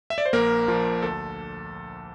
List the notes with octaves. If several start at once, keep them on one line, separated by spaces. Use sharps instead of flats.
E5
D5
C5
A#1 A#3 A#4
A#2 F3
D2 A4